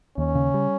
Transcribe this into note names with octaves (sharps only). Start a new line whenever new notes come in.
D#2 C#4
C#3
G3